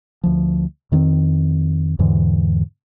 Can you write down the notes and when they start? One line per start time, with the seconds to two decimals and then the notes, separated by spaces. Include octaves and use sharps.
0.24 D2 F3
0.92 F2 D#3 A#3 C4
1.99 E2 G#2 D3 E3